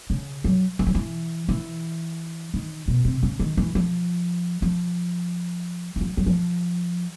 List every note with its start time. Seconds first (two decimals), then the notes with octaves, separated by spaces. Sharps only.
0.10 C#3
0.44 F#3
0.79 E3
0.87 F3
0.95 E3
1.49 E3
2.54 D#3
2.88 B2
3.05 C3
3.23 C#3
3.40 D#3
3.57 E3
3.75 F3
4.62 F3
5.96 E3
6.01 F3
6.17 F#3
6.26 F3